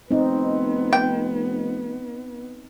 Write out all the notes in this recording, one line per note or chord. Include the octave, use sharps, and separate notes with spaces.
F1 B3 C4 D#4
G5